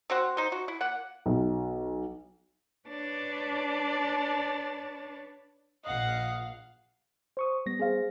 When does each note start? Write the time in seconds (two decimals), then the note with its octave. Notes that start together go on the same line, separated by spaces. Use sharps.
0.10 C4 F#4 C5 F#5
0.37 D#4 C5
0.52 F#4
0.68 E4
0.81 A#3 F#5
1.26 B1
2.89 D4 B4 C#5 D5 A5
5.85 A#1 D#5 F5 F#5
7.37 C5 C#6 D#6
7.66 G3 B3 A#6
7.79 G#4 C5 F5